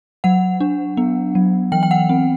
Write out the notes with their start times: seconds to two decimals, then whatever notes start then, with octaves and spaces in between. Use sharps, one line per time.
0.24 F#3 F#5
0.60 D4
0.97 B3
1.35 F#3
1.72 E3 G5
1.83 G5
1.91 F#5
2.09 C4